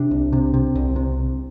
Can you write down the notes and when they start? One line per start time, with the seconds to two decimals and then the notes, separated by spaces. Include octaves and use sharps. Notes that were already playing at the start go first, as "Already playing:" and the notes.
Already playing: C3 D4
0.11 C2
0.33 C3
0.54 C3
0.75 C2
0.96 C3